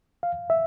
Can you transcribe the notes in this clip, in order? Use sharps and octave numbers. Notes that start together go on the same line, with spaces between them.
F5
E5